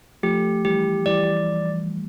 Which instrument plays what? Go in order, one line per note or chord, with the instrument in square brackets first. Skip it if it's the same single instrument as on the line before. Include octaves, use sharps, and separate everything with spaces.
[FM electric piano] F3 A3 [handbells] G4
[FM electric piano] E3 G3 [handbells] G4
[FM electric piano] E3 G3 [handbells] D5